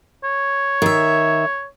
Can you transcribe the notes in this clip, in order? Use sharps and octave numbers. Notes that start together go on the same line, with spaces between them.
C#5
D#3 E5